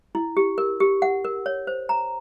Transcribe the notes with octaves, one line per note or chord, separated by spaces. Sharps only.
E4
G4
A#4
G4
F#5
A#4
C#5
C5
A#5